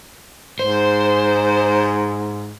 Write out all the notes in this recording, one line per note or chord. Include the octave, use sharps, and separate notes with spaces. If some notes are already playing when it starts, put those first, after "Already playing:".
G#2 C5